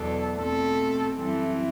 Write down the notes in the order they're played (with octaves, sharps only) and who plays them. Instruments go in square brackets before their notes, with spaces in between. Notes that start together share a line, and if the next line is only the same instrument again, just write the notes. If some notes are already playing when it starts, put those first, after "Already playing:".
Already playing: [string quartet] E2 B2 F#3 B3 D4 [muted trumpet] A4
[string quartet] B2 A3 C4 [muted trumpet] A4
[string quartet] F#2 E3 G3 C4 E4 [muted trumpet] A4